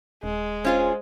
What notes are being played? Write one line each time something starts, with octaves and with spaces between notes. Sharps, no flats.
D#1 G#3
C#4 F4 G#4 C5